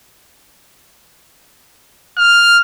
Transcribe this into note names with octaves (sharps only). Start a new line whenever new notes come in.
F6